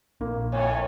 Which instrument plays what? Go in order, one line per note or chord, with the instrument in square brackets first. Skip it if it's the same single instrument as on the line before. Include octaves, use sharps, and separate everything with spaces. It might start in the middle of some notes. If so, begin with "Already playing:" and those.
[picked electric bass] A#1 [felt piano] A#3
[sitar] F2 A2 [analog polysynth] C#5 G#5